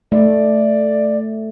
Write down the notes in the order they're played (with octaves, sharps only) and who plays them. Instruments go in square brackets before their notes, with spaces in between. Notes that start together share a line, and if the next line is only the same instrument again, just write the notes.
[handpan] A3 [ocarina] D5